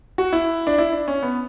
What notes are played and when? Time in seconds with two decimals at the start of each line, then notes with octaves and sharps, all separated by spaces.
0.18 F#4
0.33 E4
0.67 D4
0.78 E4
0.92 D4
1.08 C#4
1.22 B3